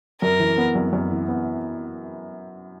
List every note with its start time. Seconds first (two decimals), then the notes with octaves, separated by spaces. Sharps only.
0.22 F#2 A#4
0.40 E3
0.58 B3
0.75 F#2
0.93 F#2
1.11 E3
1.28 B3